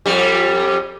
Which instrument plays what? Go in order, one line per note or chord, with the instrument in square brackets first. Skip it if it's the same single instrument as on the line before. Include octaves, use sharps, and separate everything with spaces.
[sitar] F2 G3